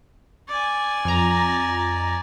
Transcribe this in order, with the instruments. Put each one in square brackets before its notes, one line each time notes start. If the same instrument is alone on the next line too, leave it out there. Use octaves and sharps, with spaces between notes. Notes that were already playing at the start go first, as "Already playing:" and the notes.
[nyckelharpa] D5 G#5
[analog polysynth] F2 A#5